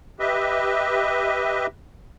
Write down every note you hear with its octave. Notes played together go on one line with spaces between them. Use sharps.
G4 B4 D#5 E5